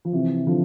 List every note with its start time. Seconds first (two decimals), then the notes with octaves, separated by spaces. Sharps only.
0.05 F3
0.13 C3 E3
0.47 D3 F3